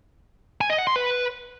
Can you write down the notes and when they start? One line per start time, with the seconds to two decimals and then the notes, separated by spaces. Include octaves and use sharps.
0.61 G#5
0.70 D#5
0.78 F#5
0.87 C6
0.96 B4